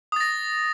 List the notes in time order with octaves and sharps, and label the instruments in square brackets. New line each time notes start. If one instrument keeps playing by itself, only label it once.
[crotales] D#6
A6
A#6